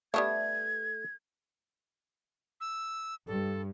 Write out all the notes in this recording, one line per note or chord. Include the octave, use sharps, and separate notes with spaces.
G3 A3 B3 D4 A4 E5 G#6
E6
G2 A4